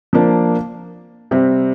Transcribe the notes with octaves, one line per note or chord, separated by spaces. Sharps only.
F3 A#3 D4
C3 G3 C4